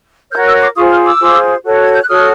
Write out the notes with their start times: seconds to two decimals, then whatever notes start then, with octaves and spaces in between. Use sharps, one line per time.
0.31 F#4 A#4 C#5 F6 G6
0.46 E6 F#6
0.61 C6 D6
0.76 F4 G#4 C5 C#6 D#6
0.91 D#6 F6
1.05 D6 E6
1.20 F4 G#4 C5
1.64 F#4 A4 C#5
1.83 G#6
1.92 G6
2.00 F#6
2.08 F#4 A4 C#5 D#6 F6